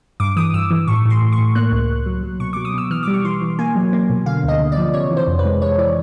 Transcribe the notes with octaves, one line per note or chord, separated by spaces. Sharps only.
G2 D6
E3 D#6
G2 E6
E3
A2 C#6
A2
C6
A2
C#6
A2
A#3 F#6
C#2
C#2
F#3
F#3
B2 C#6
F#3 D6
D#6
B2 E6
E3 F6
G3 D6
C#6
E3 C6
E3
A#3 G#5
F#3
A#3
B2
D3 F5
D2 D#5
D3
D5
F3
C3 C#5
E3
C5
F2
B4
G#3
G#3 C#5
E3 D5